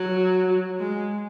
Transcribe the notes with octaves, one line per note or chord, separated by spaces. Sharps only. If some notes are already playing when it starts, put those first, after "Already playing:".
Already playing: F#3
G#3